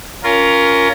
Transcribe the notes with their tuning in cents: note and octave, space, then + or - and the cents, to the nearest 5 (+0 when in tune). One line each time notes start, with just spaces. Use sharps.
C#4 +20 F4 +0 A#4 +0